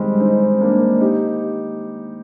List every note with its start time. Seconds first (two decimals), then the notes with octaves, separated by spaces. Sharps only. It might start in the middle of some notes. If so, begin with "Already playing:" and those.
Already playing: D#3 G3 G#3 C4
0.20 C4 D#4
0.61 A#3 D4
1.00 D#4 G4